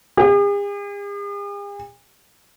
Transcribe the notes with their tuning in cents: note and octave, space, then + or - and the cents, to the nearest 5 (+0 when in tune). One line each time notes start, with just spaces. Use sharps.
G#4 -45